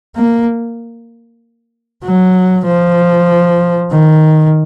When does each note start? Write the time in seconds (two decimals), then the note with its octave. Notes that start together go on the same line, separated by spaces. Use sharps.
0.16 A#3
2.04 F#3
2.66 F3
3.91 D#3